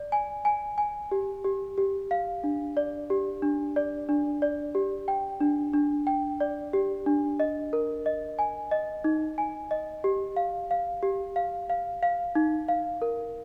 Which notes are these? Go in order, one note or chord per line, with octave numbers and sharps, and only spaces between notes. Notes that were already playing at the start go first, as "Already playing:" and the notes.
Already playing: D5
G#5
G#5
G#5
G4
G4
G4
F5
D4
D5
G4
D4
D5
D4
D5
G4
G5
D4
D4
G5
D5
G4
D4
D#5
A#4
D#5
G#5
D#5
D#4
G#5
D#5
G4
F5
F5
G4
F5
F5
F5
D#4
F5
A#4